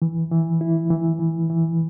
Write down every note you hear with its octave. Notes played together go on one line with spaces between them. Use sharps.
E3
E3
E4
E3
E3
E3